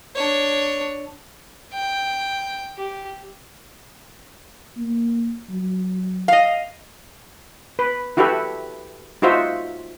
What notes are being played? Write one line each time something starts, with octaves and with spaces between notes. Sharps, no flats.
D4 C#5
G5
G4
A#3
F#3
D#5 F5
B4
E4 F#4 G4 A4 B4 E5
D#4 F4 F#4 C5 E5